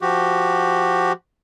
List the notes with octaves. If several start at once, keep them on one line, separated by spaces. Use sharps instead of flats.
F3 F#4 G4